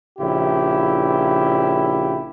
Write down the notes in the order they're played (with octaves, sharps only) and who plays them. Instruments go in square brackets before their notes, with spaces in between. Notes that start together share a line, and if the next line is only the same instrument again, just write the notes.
[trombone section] A#1 C#3 E4 G4